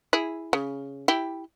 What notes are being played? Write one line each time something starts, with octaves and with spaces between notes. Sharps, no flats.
E4 G#4
C#3
E4 G4